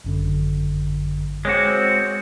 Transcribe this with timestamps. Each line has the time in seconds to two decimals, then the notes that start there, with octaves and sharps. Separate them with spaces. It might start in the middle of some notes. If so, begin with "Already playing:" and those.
0.05 G#1 F#2 D3
1.45 G#3 C4 F#4 C#5 D6